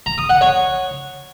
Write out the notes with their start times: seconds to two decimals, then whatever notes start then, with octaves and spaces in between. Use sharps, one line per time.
0.06 A#5
0.18 D#6
0.29 F#5
0.41 C#5